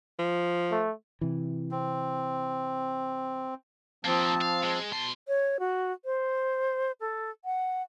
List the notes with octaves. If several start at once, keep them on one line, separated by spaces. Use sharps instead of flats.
F3
A3
C3 E3
C4
F3 A#3 C4 G4 A5
F5
G#3
B2 A5 C6
C#5
F#4
C5
A4
F#5